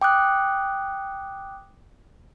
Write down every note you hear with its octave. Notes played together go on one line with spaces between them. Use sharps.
G5 D6 D#6 F#6